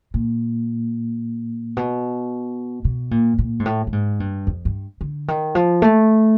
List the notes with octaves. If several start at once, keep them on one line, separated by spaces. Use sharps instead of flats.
A#2
B2
B2
A#2
A#2
G#2
A2
A2
G#2
G2
F2
G2
D3
D#3
F3
A3